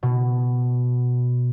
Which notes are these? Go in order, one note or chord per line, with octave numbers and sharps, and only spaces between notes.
B2